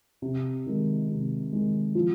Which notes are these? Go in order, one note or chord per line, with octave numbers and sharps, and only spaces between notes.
C3
D#3 G#3
C3
D#3 G#3
F3